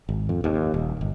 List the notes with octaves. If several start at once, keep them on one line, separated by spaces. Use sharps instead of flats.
G#1
F2
D#2
D#1
G1